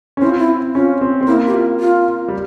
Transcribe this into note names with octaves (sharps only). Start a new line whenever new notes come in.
C#4
C4 E4
F4
E4
C#4 F4
C4
C4
A#3 E4
G4
F4
F4
G3